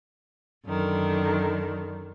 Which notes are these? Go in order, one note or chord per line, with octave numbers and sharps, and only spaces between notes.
F#2 D3 D#3